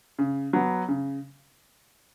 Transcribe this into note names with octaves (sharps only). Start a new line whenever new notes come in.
C#3
F#3 B3
C#3